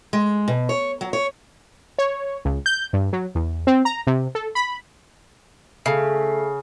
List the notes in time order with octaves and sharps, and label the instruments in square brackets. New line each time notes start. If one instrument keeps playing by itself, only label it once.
[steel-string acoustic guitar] G#3
B2
C#5
F#3
C#5
[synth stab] C#5
C#2
G6
G2
F#3
E2
C4
A#5
C3
A4
B5
[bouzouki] C#3 [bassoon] A3